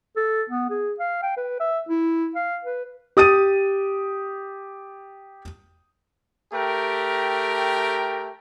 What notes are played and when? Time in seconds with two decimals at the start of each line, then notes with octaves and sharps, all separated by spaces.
0.17 A4
0.50 B3
0.70 G#4
0.99 F5
1.23 G5
1.37 B4
1.60 E5
1.89 E4
2.35 F5
2.65 B4
3.17 G4 D#6 A6 D#7
6.53 A3 G4 A#4 G5